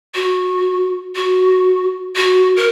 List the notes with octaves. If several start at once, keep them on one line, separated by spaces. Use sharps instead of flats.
F#4
F#4
F#4
A#4